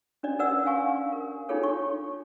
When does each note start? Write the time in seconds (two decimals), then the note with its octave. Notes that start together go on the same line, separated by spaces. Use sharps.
0.23 C#4 D4 D5 D#5
0.39 A#4 B4 D5 F#5 E6
0.65 C#4 D4 F5 G#5 C#6
1.12 A#4
1.49 D4 D#4 F4 G#4 A4 C#5
1.63 C#6